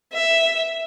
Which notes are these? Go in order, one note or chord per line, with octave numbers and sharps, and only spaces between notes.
E5